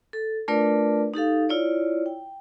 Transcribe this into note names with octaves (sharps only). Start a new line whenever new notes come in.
A4
A3 D4 F4 A#4 B4 D5
D#4 G4 A4 F5
E4 F4 C#5 D5
G5